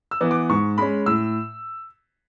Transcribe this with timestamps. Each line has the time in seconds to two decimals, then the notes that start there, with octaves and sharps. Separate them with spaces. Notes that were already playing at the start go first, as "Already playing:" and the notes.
0.11 E6
0.21 E3 B3
0.31 D6
0.49 G#2 C#6
0.78 G#3 C#4 B5
1.06 A2 E6